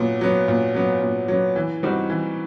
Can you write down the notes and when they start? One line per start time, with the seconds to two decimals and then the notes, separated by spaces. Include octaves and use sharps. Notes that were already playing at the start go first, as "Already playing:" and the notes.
Already playing: A#2 F#3 B3
0.21 F#3 B3
0.48 A#2
0.74 F#3 B3
1.02 A#2
1.28 F#3 B3
1.56 E3
1.83 G3 C4 D#4 F#4
2.10 E3